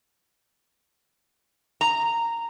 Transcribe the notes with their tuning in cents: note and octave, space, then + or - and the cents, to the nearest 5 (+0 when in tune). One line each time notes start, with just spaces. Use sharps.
A#5 -10